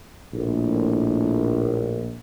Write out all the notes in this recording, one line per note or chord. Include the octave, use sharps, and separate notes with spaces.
A#1 A2